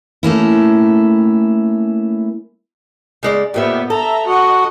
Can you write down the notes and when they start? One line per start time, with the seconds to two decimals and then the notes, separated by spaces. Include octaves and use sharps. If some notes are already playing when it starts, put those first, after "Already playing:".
0.23 A3 A#3 C#4 E4
3.23 C#3 G#3 D5
3.54 F2 A#2 B3 G4 E5
3.90 A4 E5 A#5
4.27 F#4 D#5 F#5